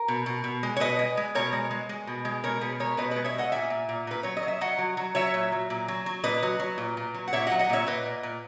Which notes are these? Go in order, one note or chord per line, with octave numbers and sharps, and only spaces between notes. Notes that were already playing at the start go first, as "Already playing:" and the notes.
Already playing: A#4
B2
B2
B2
G#3
C#5
B2 B4 D#5
G#3
G#3
B2 A#4 C#5
G#3
G#3
G#3
B2
G#3
B2 A#4 C#5
B2 G#4 B4
G#3 A#4 C#5
B2 B4 D#5
B4 D#5
G#3
C#5 E5
G#3 D#5 F#5
A#2 E5 G#5
A#2
A#2
A#2 B4
F#3 C#5
D#5
F#3
E5
F#3 D#5 F#5
F#3
F#3
F#3 C#5 E5
A#2
F#3
A#2
F#3
F#3
A#2 B4 D#5
F#3
F#3
A#2
A#2
F#3
F#5
A#2 C#5 E5
D#5 F#5
F#3
D#5 F#5
A#2 C#5 E5
A#2 B4 D#5
A#2
A#2